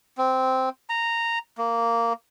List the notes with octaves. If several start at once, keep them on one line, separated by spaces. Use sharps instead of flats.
C4
A#5
A#3